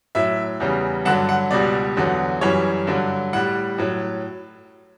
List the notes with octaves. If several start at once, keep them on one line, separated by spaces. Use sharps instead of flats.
A2 F#3 E5
E2 C#3 G3
G2 D3 F#3 F#5
F#5
C#2 B2 G3 D5
E2 D3 F#3
F#2 E3 G3 C#5
G2 D3 F#3
A2 G3 F#5
A2 F#3